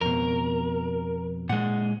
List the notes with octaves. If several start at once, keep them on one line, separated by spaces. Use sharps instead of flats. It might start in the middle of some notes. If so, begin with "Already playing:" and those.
F2 B2 A#4
A#2 G#3 F#5